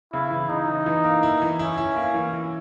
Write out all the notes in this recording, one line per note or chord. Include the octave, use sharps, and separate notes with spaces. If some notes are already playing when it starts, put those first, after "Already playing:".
C#3 E4
E3
C#3 D#4
E3
E3
A#3
E4
E3
C#4 E4
E4
A#3
E3
E3